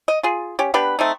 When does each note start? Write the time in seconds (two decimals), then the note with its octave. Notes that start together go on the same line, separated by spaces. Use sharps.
0.08 D#5
0.23 F4 G#4
0.59 C#4 G4
0.74 B3 D4 G4 B4
0.99 A3 C4 D#4